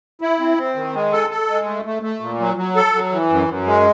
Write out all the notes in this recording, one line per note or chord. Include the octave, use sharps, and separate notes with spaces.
E4
C4
C4
D#3
G#3
A4
A4
G#3
A3
A3
A3
A#2
F#3
F#3
A4
F#3
E3
F#2
F#2
G#3